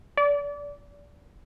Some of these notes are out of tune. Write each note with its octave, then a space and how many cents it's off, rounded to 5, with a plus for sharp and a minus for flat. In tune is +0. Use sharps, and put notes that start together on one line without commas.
D5 -25